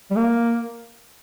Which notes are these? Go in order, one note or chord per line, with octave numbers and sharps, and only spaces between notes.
G3
A#3